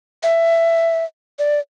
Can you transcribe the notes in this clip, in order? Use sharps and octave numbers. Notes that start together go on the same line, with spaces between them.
E5
D5